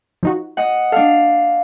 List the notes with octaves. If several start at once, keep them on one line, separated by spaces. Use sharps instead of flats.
F3 D#4 F#4
D#5 F#5
D4 A4 F5